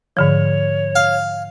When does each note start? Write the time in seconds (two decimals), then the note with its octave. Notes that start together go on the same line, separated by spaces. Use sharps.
0.17 G#2 D3 F3 C#5
0.95 F5